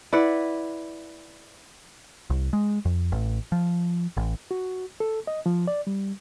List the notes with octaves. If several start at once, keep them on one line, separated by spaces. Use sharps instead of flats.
E4 B4 D5 F#5
C2
G#3
F2
A1
F3
A1
F#4
A4
D#5
F3
D5
G3